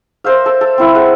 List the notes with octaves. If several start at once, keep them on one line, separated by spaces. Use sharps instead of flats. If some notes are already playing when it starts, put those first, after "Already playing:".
A#4 C5 E5 F5
A4
A4
C4 E4 F5
G#3 A4 F#5